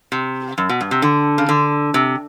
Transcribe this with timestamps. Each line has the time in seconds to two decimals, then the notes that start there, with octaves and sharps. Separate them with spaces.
0.12 C3
0.58 F#2
0.69 B2
0.81 G2
0.91 C3
1.02 D3
1.38 C#3
1.49 D3
1.94 C3